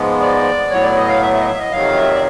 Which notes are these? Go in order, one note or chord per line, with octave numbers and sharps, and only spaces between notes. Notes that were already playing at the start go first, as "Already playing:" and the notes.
Already playing: G#2 F3 G#3 B3
D5
A2 F#3 B3 C#5
D5
D#5
F5
E5
E5
D#5
E5
D#5
F2 C3 D#3 F#3 F5
E5
D5